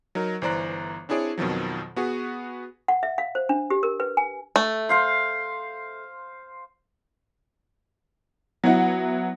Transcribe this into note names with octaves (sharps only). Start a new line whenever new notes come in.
F#3 D#4 A#4
G1 E3 C5 D5 A#5 F#6
C4 D4 E4 G#4 C#5 D5
F2 B2 D#3 F3 F#3
B3 F#4 G#4 B4
F#5
E5
F5
C5
D4
G4
A#4
B4
G#5
A3
C5 F5 C6
F#3 B3 E4 F#4